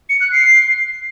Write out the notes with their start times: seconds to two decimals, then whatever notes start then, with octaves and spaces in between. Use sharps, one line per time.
0.09 C#7
0.21 F#6
0.32 C7